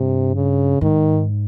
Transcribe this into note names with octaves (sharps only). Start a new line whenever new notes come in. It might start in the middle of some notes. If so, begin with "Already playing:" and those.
Already playing: G2 C3
C#3
G#2 D#3